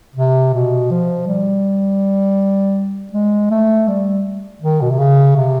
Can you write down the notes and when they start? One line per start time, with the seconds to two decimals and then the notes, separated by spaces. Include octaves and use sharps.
0.16 C3
0.54 B2
0.91 F3
1.28 G3
3.13 G#3
3.51 A3
3.88 G3
4.62 D#3
4.82 B2
4.91 C3
4.99 C#3
5.37 C3